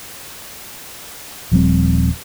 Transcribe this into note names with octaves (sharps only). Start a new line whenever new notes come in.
D#1 F3 G3 C4